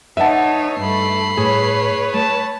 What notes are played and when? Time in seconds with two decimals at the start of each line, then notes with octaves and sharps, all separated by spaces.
0.17 D#4 B4 C#5 D#5 E5 F#5 A5
0.80 G2 A3 B5 C7
1.37 A2 G#4 B4 C#5
2.14 A3 A5